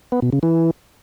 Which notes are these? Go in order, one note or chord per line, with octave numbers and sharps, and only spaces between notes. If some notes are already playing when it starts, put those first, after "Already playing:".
B3
B2
C#3
E3